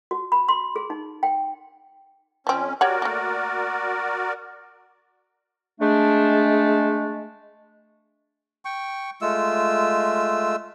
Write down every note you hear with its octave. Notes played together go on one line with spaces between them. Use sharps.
F#4
B5
C6
G#4
D#4
G5
F2 F3 C4 C#4
F#4 G4 A#4 C#5 D5 F#5
A3 A#3
G#3 A3 D4
G5 C#6
G#3 A3 F4 E6